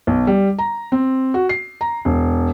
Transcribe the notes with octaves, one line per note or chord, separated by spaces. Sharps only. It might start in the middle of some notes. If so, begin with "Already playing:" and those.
B1
G3
A#5
C4
F#4
C7
A#5
E1